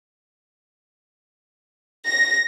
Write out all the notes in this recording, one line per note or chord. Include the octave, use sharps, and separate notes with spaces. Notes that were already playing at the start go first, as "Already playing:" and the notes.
A#6